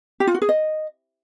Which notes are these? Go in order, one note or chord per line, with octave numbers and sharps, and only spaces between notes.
G4
F4
F#4
G#4
D#5